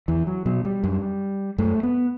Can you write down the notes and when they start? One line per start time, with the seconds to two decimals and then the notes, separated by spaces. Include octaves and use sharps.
0.08 E2 E3
0.27 F#3
0.46 B2 F#3
0.65 G3
0.84 F#2
1.58 F#2 A3
1.83 B3